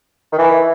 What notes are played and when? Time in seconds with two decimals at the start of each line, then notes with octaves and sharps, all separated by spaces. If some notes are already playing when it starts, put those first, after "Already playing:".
0.32 D#3
0.38 E3